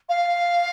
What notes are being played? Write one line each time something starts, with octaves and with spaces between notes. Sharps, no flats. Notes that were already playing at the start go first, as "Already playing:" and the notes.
F5